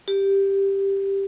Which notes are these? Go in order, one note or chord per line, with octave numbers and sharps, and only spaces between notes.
G4